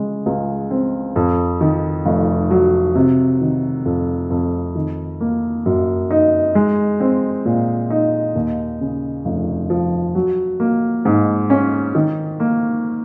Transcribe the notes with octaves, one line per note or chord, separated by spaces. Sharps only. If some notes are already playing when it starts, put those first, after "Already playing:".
Already playing: C#3 G#3
C#2
C4
F2
D#3
F1
F#3
C3
D#3
F2
F2
D#3
A#3
F#2
D#4
G#3
C4
A#2
D#4
D#2
C#3
F1
F3
F#3
A#3
G#2
C#4
D#3
A#3